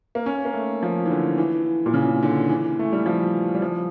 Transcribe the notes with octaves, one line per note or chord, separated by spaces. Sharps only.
A#3
C#4
A#3
A3
F3
E3
D3
E3
A#2
C#3
D3
E3
A3
G3
F3
G3
F3